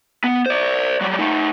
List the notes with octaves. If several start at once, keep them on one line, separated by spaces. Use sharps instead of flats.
B3
C5 D5
F#3 G3
A3 D#4